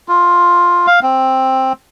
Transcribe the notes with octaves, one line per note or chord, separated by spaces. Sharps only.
F4
F5
C4